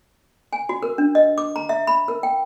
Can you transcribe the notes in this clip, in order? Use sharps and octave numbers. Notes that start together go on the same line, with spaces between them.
G#5
F#4
A#4
D4
D#5
D6
A#5
E5
B5
A#4
G5